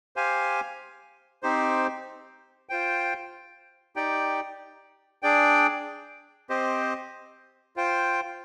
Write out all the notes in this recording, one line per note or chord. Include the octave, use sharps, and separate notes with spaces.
G4 C5 F5 G#5
C4 D#4 G4 C5
F4 C5 G5
D#4 G4 D5 G5
D4 G#4 D5 G5
C4 G4 C5 D#5
F4 C5 G5